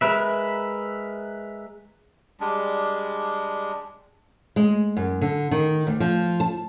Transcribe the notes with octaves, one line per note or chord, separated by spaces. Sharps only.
G#3 A#4 B4 E5
G3 G#3 D4
G#3
F#2
D3
D#3
D2
F3
A5